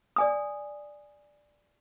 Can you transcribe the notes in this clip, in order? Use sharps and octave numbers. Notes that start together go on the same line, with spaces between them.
D5 G#5 D#6